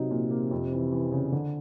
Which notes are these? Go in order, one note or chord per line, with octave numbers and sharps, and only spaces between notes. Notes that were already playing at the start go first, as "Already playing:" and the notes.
Already playing: C3 F#3 D#4
A#2
A#3
F2
E3
E3
C#3
D3